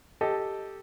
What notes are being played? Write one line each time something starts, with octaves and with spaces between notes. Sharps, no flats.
G4 A4 D#5